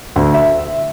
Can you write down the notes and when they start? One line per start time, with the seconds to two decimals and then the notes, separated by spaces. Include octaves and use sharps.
0.16 D2
0.34 E5